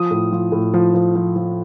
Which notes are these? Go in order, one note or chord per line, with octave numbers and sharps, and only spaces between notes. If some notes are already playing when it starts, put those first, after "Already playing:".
Already playing: F3 D#6
A2
F3
A2
F3
F3
F3
F3